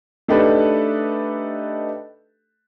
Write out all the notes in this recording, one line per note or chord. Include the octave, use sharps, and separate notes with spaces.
A3 D4 D#4 G4 A4 B4